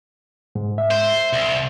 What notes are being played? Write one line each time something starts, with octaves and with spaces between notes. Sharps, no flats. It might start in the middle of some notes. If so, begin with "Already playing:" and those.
G#2
E5
C5
C2